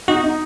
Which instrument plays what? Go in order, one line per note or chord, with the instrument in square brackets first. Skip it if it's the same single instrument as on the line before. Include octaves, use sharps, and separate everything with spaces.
[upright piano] D#4 [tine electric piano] F#4
[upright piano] D#4